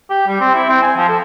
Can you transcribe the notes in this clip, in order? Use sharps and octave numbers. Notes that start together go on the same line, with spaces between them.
G4
G3
C4
E4
C4
G#5
F3
A4